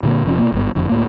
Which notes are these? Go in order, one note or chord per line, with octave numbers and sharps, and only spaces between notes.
A#2 D3 G3 A#3
F#1 C3 F3 C#4
B2 D#3 A#3
G#1 G2 D#3 B3
F#1 F2 D3
D1 A2 A#3